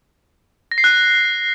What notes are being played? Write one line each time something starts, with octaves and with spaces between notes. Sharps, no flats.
A#6
C7
F#6